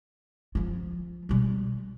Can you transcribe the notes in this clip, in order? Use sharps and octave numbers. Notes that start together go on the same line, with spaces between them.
F3 F4
B2 G3